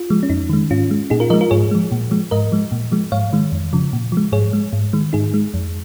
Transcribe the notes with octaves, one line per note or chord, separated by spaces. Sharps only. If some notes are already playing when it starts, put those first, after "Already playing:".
Already playing: F4
F3 G#3
C#4
F2 D#4
D#3 G#3
G#2 C#4 F4
G#3
A#2 D#4 G#4
F4 A#4
F3 G#3 A#4 D#5
F4 A#4
G#2 G#4 C#5
F3 G#3
A#2
F3 G#3
G#2 A#4 D#5
F3 G#3
A#2
F3 G#3
G#2 C#5 F5
D#3 G#3
F2
C#3 F3
A#2
F3 G#3
G#2 G#4 C#5
G#3
G#2
D#3 G#3
G#2 D#4 G#4
G#3
F2